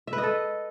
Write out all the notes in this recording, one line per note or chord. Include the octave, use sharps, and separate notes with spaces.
E5
B4
D#5
A4